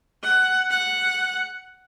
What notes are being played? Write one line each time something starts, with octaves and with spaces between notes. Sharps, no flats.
F#5
F#5